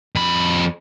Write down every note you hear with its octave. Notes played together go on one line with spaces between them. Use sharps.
F2 B5